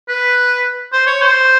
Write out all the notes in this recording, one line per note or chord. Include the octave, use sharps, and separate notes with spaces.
B4
C5
C#5
C5